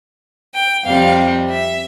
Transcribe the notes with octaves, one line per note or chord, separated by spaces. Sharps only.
G5
F2 C3 G3 F5
E5